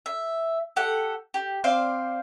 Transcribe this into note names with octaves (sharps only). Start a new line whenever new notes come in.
E5
G4 A4 F#5
G4
C4 C5 D5 F5